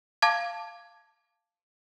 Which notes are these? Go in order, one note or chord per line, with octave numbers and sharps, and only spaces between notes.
F5 A5 D6 G#6